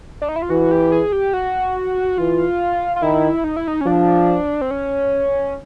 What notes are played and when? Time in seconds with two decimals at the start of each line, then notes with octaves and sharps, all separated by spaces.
0.22 D4
0.29 D#4
0.36 E4
0.42 F4
0.50 E3 F#4
0.71 G4
0.92 G#4
1.12 G4
1.33 F#4
2.18 E3 F4
2.96 F4
3.02 D#3 E4
3.44 D#4
3.56 E4
3.68 D#4
3.81 C#4
3.86 F3 D4
4.61 C4
4.71 C#4